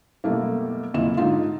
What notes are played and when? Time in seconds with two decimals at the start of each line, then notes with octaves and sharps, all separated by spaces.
0.24 F#2 B2 G3 A3 A#3
0.94 F#1 F2 A#2 E4 E7
1.17 G#2 D3 D#4 F4